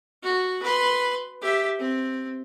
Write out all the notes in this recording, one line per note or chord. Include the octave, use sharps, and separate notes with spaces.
F#4
B4 C6
G4 E5
C4